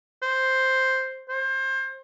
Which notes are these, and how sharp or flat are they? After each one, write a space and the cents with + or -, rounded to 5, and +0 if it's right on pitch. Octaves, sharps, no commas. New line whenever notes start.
C5 +0
C5 +25